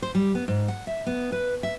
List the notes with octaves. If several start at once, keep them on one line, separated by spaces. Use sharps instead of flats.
C5
G3
B3
G#2
F#5
E5
B3
B4
E5